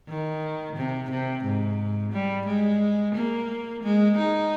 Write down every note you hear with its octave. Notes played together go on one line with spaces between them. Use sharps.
D#3
C3
C3
G#2
G3
G#3
A#3
G#3
D#4